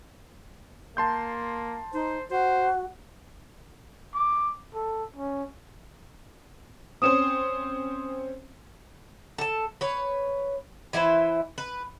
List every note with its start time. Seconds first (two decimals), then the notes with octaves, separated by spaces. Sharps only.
0.97 A#3 A5 C6 G6
1.93 D#4 C5
2.30 F#4 C5
4.15 D6
4.74 A4
5.16 C#4
7.02 C4 C#4 C5 D#6 E7
9.38 A4 A5
9.81 B4 C#5
10.93 E3 E4 B4 C5
11.58 B4